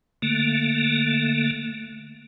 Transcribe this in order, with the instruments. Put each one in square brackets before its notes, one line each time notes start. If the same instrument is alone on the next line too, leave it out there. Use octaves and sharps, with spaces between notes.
[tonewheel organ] D3 A3 A#3